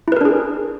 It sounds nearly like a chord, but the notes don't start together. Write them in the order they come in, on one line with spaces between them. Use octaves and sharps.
E4 B4 A#4 D4 G#4